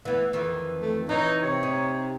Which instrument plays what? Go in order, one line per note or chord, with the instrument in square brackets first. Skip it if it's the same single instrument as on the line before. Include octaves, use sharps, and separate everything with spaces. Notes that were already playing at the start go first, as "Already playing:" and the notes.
[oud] E3 B3
F2 D#3 E3
[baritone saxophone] A3
[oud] E3 [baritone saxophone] D#4 [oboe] C#5
[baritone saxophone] C3 [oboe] C#5
[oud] D#4